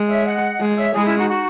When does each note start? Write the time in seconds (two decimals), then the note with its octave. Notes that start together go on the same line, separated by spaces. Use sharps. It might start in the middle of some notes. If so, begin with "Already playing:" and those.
Already playing: G#3
0.09 C#5 E5
0.26 D#5 F#5
0.61 G#3
0.78 C#5 E5
0.95 G#3 E4 G#4
1.07 C#4 E4
1.18 D#4 F#4
1.30 D#4 F#4